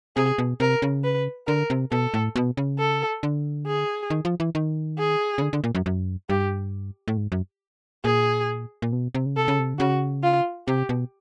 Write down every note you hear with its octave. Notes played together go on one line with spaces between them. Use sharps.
C3 G#4
B2
C3 A#4
C#3
B4
D3 A#4
C3
B2 A4
A2
B2
C#3
A4
D3
G#4
D#3
F3
E3
D#3
G#4
C#3
D3
D3
A#2
F#2
F#2
G2 G4
A2
G#2
F#2
A#2 G#4
A#2
B2
C3
C#3
C3 A4
C#3
C3
D3
C#3 F#4
F4
C3 G4
B2